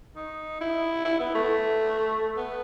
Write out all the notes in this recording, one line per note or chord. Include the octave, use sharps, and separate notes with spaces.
D#4
E4
E4
B3
A3
B3